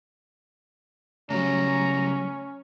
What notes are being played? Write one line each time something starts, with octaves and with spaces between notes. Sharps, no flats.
C#3 F#3 G3 A3 C#4 A#5